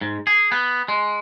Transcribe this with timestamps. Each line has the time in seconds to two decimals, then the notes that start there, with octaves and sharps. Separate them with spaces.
0.01 G#2
0.27 G#4
0.52 B3
0.88 G#3